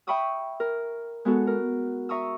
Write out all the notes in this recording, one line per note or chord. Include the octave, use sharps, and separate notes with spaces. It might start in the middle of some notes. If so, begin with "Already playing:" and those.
E5 G5 B5 C#6 D#6 E6
A#4
G#3 B3 F#4 A4
A#4
E5 A#5 C#6 D#6 E6